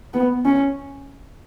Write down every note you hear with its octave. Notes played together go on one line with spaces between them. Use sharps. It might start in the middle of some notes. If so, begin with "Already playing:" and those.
B3
C#4